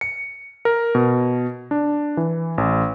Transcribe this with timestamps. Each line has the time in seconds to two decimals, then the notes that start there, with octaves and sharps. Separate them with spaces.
0.01 C#7
0.65 A#4
0.95 B2
1.71 D4
2.17 E3
2.58 A1